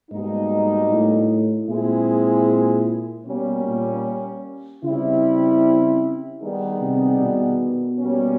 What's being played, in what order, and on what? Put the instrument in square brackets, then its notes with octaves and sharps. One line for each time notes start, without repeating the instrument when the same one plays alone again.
[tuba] G#2 [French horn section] B2 G3 A#3 D#4
[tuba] A2
[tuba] A#2 [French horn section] G#3 C4 E4 G#4
[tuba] B2 [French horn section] G3 A#3 C#4
[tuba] A#2
[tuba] C#3 [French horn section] G3 C4 E4
[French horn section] D#3 G3 B3 D#4 G#4
[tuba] C3
B2
[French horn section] G3 A#3 C#4